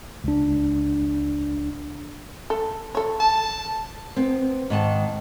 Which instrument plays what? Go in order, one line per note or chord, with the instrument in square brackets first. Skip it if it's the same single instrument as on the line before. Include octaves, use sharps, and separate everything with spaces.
[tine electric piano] C#2 D4
[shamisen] A4
A4 C#5
[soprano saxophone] A5
[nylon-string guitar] B3 C4
G#2 D#3 A5